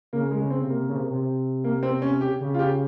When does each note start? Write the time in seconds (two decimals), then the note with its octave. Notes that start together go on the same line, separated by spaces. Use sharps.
0.13 C#3 A#3
0.31 G#3
0.38 C#3
0.50 C4
0.64 C3
0.70 A#3
0.89 C#3
0.96 C3
1.10 C3
1.64 A#3
1.83 C4
2.02 C#4
2.21 G4
2.41 C#3
2.54 F4
2.59 G4